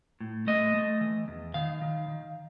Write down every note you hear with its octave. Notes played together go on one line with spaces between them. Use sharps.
A2
A3 D#5
A3
E3
E2
D#3 F5
D#3
D#3